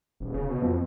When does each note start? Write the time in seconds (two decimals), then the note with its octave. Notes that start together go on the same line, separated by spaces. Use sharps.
0.20 D#1
0.34 C#3
0.48 B2
0.62 F2